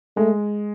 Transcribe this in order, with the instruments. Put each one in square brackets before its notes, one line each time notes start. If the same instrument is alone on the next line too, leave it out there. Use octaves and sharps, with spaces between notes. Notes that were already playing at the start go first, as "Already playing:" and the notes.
[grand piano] G#3 [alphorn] A3